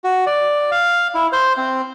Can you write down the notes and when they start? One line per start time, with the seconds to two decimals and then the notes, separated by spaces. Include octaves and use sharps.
0.04 F#4
0.26 D5
0.71 F5
1.15 E4
1.33 C5
1.57 C4